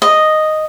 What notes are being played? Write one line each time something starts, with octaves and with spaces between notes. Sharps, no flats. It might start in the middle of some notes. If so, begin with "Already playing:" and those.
D#5